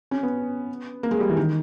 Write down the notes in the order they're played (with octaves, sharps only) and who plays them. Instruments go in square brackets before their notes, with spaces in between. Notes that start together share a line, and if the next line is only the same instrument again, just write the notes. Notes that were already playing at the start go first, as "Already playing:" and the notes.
[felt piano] C#4
B3
A#3
G#3
G3
E3
D#3